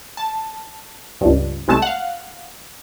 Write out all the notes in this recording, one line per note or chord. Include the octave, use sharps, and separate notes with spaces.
A5
C#2 G2
C2 G#3 A3 A5 E7
F5 F#5